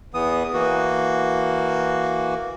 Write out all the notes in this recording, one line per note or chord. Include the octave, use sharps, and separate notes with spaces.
E2 E3 B3 D#6
E3 A#3 F#4